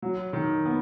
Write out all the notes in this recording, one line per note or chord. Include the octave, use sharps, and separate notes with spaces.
F#3
D#3
B3